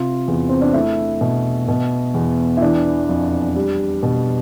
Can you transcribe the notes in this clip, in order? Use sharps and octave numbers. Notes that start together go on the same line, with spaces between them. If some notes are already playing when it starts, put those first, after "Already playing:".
Already playing: C3 F4
E2
C4
D4
A3 E4
B2
B2
E2
E4
E3 D4
F2
G3
B2